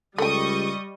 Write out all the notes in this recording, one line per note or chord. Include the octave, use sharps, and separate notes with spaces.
C#2 G3 A3 D#5 G5 C#6 D#6